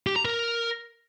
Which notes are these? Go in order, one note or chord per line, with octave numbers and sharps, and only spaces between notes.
G4
A#5
A#4